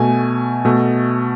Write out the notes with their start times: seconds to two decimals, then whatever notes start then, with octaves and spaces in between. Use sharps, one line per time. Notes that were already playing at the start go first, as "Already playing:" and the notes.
Already playing: B2 A3 G#5
0.65 B2 A3